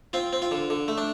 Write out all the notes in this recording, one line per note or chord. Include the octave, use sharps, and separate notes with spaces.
C4 F4
C4
F4
D3
D3
A3
D4